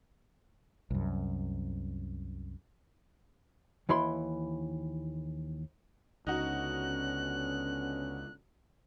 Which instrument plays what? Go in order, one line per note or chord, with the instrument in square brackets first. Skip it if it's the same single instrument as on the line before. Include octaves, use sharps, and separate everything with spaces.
[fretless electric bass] C2 F#2
[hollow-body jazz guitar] D#2 E3 E4 B5 C6
[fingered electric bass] C#2 [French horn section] D3 B3 C#4 [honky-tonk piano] D#4 F#4 [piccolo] F#6